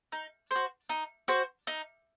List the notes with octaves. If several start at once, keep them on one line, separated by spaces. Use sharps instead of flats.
D#4
F#4 C5
D#4
F#4 C5
D#4